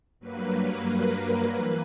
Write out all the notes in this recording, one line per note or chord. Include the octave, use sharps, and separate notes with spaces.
G2 F#3 A#3 B4
A#4
E3 A#3 B4